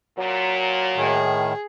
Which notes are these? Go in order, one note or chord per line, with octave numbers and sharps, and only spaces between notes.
A#2 F#3
A2 D#3 G#4